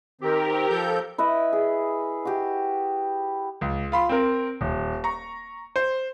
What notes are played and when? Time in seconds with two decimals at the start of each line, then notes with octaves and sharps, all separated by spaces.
0.21 D#3 C4 G4 A#4
0.70 F3 A4 G6
1.18 E4 B4 D#5
1.53 G#4
2.25 F#4 G4
3.61 C#2
3.92 F4 B5 C6
4.09 C4 A#4
4.61 D#1
5.04 A#5 C#6
5.76 C5